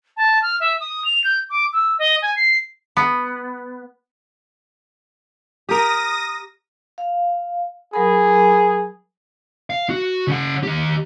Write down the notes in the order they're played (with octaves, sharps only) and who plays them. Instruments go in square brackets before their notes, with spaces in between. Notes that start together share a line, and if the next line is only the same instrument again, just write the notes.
[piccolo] A5
F6
E5
D#6
F7
G6
D6
E6
D#5
G#5
C7
[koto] B3
[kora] G4 A#4 [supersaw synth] D#6 A#6
[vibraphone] F5
[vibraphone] F#3 A#4 B5 [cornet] G#4
[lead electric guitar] F5
F#4
C#3 F#5
D#3 G4